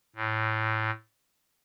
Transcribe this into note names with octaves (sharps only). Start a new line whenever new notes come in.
A2